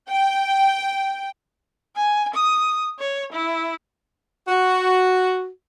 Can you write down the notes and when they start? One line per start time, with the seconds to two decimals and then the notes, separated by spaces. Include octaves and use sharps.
0.11 G5
1.96 G#5
2.34 D#6
2.99 C#5
3.33 E4
4.48 F#4